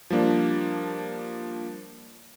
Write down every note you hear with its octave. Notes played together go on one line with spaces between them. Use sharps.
F3 G3 A#3 D4